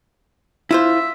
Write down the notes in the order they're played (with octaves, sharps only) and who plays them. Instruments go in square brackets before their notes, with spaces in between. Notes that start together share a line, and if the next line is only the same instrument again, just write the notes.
[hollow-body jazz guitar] E4 F4 C5 [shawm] E5